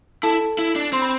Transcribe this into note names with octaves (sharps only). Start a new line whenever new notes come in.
E4 A4 A5
E4
D4
C4 C6
B5